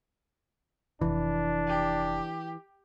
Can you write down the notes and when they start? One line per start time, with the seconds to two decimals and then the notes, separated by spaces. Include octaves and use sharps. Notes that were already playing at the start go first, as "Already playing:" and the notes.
1.01 F1 E3 D4 F4
1.68 G4